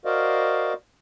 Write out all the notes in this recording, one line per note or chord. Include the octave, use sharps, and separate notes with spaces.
F#4 A#4 C5 D5 D#5 F5